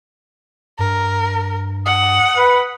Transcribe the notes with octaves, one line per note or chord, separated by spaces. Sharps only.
G2 A#4
F#5 D#6
B4